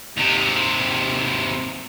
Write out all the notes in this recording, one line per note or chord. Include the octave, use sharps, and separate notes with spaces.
D#2 C3